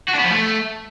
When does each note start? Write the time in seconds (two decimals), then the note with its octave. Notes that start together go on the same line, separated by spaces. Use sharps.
0.08 F#4
0.14 D4
0.19 B3
0.24 F3
0.30 A3